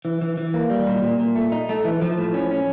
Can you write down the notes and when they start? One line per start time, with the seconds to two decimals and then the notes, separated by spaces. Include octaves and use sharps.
0.05 E3
0.22 E3
0.37 E3
0.54 A#3
0.70 G3
0.87 A#2
1.03 A#2
1.19 A#2
1.36 A3
1.52 D#4
1.69 A3
1.85 E3
2.02 F3
2.18 A2
2.34 C#4
2.51 C#4